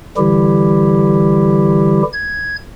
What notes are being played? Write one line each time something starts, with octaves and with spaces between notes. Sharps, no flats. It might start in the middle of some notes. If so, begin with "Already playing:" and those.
D3 E3 G3 E4 G4
G#6